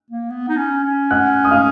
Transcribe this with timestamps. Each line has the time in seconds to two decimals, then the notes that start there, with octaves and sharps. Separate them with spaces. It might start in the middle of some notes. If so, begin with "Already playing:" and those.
0.11 A#3
0.30 B3
0.49 D#4
0.57 C#4
0.84 C#4
1.11 F#5 F#6
1.44 D#6
1.51 F5 F6